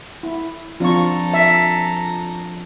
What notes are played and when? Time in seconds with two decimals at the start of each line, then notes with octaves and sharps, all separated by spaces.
0.23 E4
0.80 F3 C4 D4 F4 A4 A#5 C#6
1.34 E5